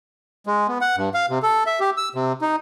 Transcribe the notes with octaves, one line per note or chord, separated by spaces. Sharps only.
G#3
B3
F#5
G2
F5
C3
A4
E5
G4
E6
C3
D#4